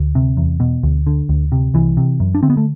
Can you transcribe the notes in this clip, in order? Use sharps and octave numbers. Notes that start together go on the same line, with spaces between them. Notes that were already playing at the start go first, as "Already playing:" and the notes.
Already playing: D2
C3
E2
B2
D2
D3
D2
C3
C2 E3
C3
F#2
D4
D3 C4
B3
A3